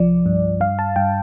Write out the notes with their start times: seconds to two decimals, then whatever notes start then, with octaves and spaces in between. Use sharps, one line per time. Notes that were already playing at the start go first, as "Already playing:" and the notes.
Already playing: C2 F3 D5
0.26 G2
0.60 G2 F5
0.79 A5
0.96 G2 G5